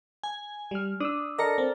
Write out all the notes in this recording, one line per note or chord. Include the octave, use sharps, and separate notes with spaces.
G#5
G3 F6
D4 D#6 E6
A4 A#4 D5 D#5 A#6 C#7
C4